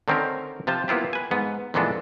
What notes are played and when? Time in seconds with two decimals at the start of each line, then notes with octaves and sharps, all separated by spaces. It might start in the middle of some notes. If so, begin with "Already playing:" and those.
0.08 D3 D#3 C4 C#4 A#4
0.67 C3 F3 F4 C5 A5
0.88 A#3 B3 E4 F4 G4
1.13 B4 G#5
1.31 G#2 B3
1.74 F2 A#2 E3 G#3 B3 D4